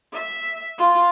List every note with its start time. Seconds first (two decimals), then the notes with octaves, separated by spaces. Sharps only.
0.13 E5
0.78 F4